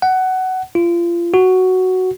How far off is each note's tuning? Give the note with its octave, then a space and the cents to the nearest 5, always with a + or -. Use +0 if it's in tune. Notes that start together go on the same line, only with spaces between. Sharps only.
F#5 +15
F4 -30
F#4 +5